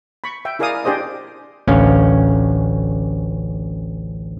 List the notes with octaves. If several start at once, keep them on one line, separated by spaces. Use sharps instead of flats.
B5 C#6
E5 G5
E4 G#4 A#4 D5 F5 D#6
D4 G4 G#4 C5 D5 D#5
A1 D2 C#4 F5